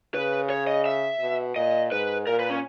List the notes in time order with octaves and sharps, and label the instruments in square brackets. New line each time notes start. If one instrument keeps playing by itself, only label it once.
[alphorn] C#3 [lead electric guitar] B4
[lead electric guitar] C#5
D#5
E5
[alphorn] B2
[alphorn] A#2 [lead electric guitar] D#5
[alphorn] G#2 [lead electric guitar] B4
[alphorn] A#2 [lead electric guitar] A#4
[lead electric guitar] B4
C#4